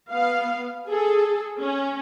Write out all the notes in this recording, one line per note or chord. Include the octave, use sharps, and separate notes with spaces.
B3 F5
G#4 A4
C#4